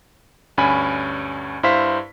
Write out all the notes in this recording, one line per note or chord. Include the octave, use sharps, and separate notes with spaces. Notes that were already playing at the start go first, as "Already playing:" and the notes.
D2 G2 C#4 G#5 B5
G2 E4 C5 F5 B6